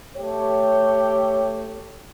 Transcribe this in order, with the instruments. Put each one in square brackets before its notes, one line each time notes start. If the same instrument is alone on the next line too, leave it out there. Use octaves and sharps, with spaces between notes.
[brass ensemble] A3 G4 C#5